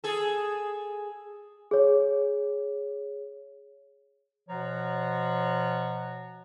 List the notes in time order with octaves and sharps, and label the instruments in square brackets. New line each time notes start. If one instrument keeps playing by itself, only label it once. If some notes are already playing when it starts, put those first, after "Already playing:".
[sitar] G#4 A4
[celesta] G#4 C#5
[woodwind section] B2 F3 C#5 F#5 A#5